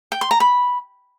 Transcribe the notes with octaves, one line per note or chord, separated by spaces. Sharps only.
G5
C6
A#5
B5